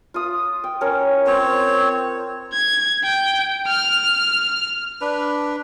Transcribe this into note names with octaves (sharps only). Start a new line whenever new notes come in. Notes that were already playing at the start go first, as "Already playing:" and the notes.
F4 D#6
G5
C#4 A#4 C#5
C4 C5 C#5
G#6
G5
F6
D4 B4